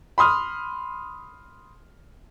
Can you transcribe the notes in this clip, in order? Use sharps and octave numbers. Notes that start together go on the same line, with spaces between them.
B5 C6 D#6 F6